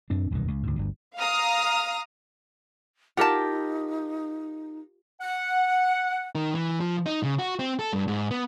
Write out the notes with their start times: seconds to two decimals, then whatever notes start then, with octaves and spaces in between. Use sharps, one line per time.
0.10 F#2 C4 D4
0.31 E1 C2 F#2 D#3
0.48 C#2
0.63 D2 G#2
0.76 G1 D2
1.18 F5 A#5 D#6 F6
3.17 D#4 F4 G4 A#4 F#5 A5
5.21 F#5
6.35 D#3
6.55 E3
6.80 F3
7.06 D#4
7.23 C#3
7.39 F#4
7.59 C4
7.79 A4
7.93 G2
8.08 G#2
8.31 B3